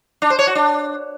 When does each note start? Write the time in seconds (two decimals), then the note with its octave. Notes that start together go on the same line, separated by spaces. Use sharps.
0.22 D4
0.30 C5
0.39 C#5
0.47 F#4
0.55 D4